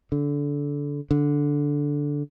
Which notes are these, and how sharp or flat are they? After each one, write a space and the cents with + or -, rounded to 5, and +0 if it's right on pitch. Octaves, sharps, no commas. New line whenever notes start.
D3 -20
D3 -10